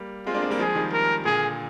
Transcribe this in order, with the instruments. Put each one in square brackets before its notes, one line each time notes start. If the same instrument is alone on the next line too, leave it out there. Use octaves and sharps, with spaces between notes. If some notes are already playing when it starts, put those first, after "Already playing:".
Already playing: [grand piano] G3 A#3
[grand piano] G#3 C4 [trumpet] F4
[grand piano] A#3 D4
G#3 C4
G3 A#3
[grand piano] F3 G#3 [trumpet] G#4
[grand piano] D#3 G3
[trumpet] A#4
[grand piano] A#2 D3 [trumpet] G#4